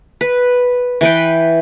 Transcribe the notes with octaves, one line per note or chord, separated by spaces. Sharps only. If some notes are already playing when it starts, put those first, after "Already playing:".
B4
E3 B4 G5